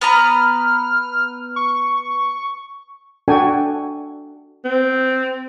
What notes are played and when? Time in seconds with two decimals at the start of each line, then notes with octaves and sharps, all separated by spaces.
0.01 B3 B4 A#5 F6
1.56 C#6
3.28 D4 F#4 A4 D5 G5 G#5
4.65 C4